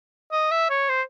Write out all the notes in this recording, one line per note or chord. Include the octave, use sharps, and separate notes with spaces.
D#5
E5
C#5
C5